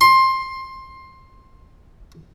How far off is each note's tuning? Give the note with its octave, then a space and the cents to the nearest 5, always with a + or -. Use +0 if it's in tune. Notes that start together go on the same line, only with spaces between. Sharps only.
C6 +15